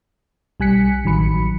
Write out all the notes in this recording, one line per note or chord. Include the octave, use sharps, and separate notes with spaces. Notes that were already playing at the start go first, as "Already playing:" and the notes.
B1 G3 G#5 F#6 B6 C#7
A1 D#3 F#3 B5 C#7